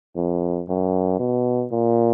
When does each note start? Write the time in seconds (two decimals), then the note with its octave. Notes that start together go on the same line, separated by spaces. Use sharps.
0.16 F2
0.69 F#2
1.20 B2
1.72 A#2